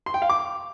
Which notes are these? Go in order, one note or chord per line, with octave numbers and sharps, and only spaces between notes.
C6
G5
F5
D6